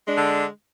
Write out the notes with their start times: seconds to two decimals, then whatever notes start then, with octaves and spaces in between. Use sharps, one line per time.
0.04 G#3
0.09 D4
0.13 D3